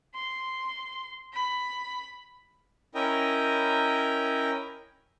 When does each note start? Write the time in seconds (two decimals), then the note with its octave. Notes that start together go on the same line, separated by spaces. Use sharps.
0.15 C6
1.33 B5
2.95 C#4 E4 A#4 D#5 G5